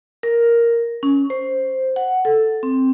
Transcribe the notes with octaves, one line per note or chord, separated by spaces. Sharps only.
A#4
C#4
C5
F#5
A4
C4